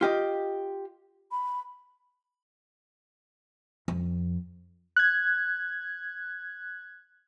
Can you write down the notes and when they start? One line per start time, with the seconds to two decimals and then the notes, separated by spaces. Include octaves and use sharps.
0.01 F4 G4 D#5
1.31 B5
3.88 F2
4.96 F#6 G#6